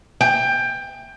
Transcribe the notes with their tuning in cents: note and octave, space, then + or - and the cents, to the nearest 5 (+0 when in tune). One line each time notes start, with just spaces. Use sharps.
G5 +20